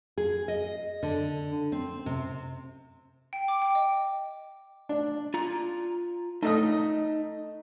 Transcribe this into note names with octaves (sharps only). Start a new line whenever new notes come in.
G#4
D#5
D3
C4
C3
G5
D6
G5
D#5
D4
F4 A#5
A3 D#4 A4 D#5 D#6